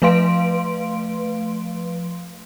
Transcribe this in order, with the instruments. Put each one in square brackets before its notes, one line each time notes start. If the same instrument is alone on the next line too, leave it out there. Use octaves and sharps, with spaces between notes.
[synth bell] F3 A3 B4 F5 C6 D7